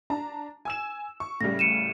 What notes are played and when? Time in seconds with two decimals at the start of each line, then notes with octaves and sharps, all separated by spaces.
0.10 D4 A5 A#5
0.65 G#5 E6 E7
1.20 C#6
1.41 A2 C#3 G3 A#6
1.59 C#7 D#7 E7